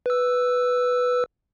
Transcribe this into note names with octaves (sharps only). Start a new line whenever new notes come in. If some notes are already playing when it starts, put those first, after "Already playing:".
B4 E6